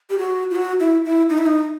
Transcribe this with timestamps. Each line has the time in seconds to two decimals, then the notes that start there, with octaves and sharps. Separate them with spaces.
0.10 G4
0.18 F#4
0.51 F4
0.55 F#4
0.80 E4
1.05 E4
1.29 D#4
1.38 E4
1.46 D#4